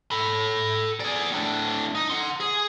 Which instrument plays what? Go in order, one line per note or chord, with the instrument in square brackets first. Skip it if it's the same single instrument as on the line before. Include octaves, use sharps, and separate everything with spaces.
[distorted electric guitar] A4 B5
G#4 D5
A2 D4
D#4
F#5 C6
G#4